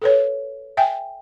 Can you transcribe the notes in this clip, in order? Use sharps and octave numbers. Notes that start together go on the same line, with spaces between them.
A4 B4 C#5
E5 G5 G#5